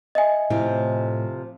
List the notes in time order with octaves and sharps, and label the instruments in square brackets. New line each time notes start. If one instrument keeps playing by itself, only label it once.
[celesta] D#5 E5 G#5
[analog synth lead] A2 [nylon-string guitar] C3 F3